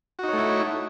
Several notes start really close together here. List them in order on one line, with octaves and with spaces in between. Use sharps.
F#4 D#4 C#5 A3 E4